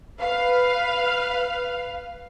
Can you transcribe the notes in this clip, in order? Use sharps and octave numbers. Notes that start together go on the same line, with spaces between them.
B4 F5